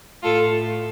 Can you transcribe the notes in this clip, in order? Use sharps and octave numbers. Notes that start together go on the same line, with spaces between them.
A2 F4 A4